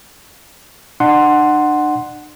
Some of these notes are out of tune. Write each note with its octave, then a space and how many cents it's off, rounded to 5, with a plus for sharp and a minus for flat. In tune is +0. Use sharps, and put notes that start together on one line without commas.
D4 +40 F#5 +0 C6 +0